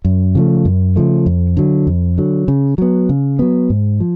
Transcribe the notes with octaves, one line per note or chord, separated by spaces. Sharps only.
F#2
C#3 F3 A3
F#2
C#3 F3 A3
F2
D3 F#3
F2
D3 F#3
C#3
F#3 B3
C#3
F#3 B3
G#2
F3